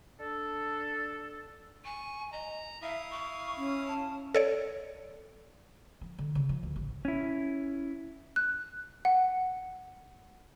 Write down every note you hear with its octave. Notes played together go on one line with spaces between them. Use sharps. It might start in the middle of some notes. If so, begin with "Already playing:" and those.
D4 A4
G#5 C#6
D#5 A#5
E4 E5 F5 D#6
C#6
C#4
A5
A4 C#5 D5
F3
D3
C#3
F3
D2
A1
C#4 E4
F#6
F#5